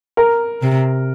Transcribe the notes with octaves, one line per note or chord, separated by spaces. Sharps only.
A#4
C3